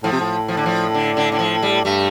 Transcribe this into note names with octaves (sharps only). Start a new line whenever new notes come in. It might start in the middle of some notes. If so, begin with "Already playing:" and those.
A2 F3
C3
A2
F3
D3
F3
D3
D3
D3
F3
G3
G2 A3